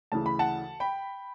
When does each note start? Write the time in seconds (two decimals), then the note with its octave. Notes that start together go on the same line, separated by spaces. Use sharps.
0.12 D2 C#3 E3 A5
0.26 B5
0.39 F#5 A5
0.80 G5 B5